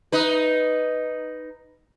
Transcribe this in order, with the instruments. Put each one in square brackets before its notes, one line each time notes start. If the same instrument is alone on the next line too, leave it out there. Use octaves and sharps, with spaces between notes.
[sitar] D#4 B4